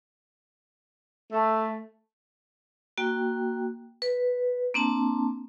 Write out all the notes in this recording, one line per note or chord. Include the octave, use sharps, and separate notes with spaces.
A3
A#3 F#4 G5
B4
A#3 C4 D4 A5